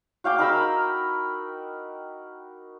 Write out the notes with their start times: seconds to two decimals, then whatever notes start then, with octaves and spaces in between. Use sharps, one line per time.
0.24 F#4 F5 G5 D6
0.38 D#4 A#4 B5 E6